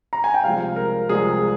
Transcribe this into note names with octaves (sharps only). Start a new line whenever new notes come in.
A#5
G#5
G5
C2 C3 F3 G#3 F5
A#4
C2 C3 F3 G#3 G#4